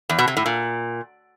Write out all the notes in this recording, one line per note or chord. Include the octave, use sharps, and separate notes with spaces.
E2
B2
C3
A2
A#2